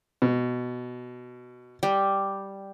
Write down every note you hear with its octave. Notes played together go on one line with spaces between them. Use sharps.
B2
G3